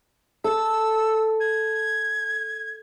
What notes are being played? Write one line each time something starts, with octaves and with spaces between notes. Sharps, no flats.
A4 E6
G#6